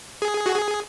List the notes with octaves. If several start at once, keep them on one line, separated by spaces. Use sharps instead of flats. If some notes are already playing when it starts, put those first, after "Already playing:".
G#4
F#4
G#4